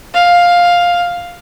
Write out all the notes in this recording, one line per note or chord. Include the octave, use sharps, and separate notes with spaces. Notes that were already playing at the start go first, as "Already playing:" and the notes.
F5